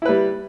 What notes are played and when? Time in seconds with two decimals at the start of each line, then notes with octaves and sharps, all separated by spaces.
0.02 E4
0.05 B4
0.09 G3